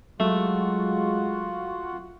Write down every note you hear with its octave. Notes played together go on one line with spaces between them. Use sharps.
F#3 G#3 A3 F4 F#4 F#5